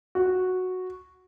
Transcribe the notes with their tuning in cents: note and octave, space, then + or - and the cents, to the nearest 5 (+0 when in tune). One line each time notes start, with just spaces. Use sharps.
F#4 -5